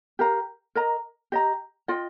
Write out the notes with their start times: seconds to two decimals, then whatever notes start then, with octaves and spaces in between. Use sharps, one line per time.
0.19 G4 A#4 F5 A#5
0.75 A#4 D#5 A#5
1.32 G4 D#5 A#5
1.88 F4 D#5 G5